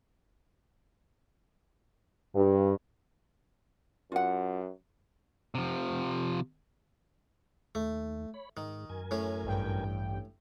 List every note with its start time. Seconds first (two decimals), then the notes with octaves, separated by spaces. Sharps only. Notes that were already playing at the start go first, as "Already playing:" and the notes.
2.34 G2
4.12 F#2 F4 F#5
5.55 C3 F3
7.75 D#2 A3
8.34 C#5 B5
8.57 G#2 D#3
8.90 F#2 A#4 G#5
9.11 A2 C#4
9.44 A1 G2 G5